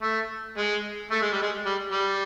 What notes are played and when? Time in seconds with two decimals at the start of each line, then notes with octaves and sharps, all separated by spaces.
0.02 A3
0.58 G#3
1.11 A3
1.22 G#3
1.33 G3
1.42 G#3
1.66 G3
1.92 G3